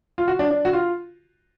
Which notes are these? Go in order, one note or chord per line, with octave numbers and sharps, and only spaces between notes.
F4
F#4
D4
D4
F#4
F4